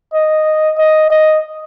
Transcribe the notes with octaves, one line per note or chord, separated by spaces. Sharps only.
D#5
D#5
D#5